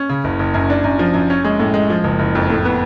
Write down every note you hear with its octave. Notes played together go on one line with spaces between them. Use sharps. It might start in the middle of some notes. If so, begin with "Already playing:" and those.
Already playing: C#4
C#3
F#1
F#1
F#2
D4
F#2
F3
F#2
C#4
G#3
A2
G#3
F3
F#1
F#1
F2
A2
B3